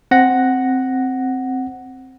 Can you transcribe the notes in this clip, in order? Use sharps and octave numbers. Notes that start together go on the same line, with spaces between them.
C4 F#5 A#6